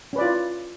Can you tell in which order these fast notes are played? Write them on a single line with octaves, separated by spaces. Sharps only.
C#4 B4 D5 F4 E4